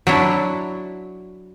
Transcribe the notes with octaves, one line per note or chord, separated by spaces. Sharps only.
F#3 D4 E4